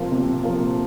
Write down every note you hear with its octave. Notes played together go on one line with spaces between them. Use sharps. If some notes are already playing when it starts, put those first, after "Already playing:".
Already playing: C3 F3 A#3 F4
C3
F3 A#3 F4